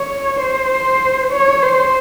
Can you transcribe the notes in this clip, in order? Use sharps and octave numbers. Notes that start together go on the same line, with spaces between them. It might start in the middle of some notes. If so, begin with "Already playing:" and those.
Already playing: C#5
C5
C#5
C5